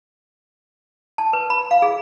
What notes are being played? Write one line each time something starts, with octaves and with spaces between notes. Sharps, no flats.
A5
B4
B5
F5
G#4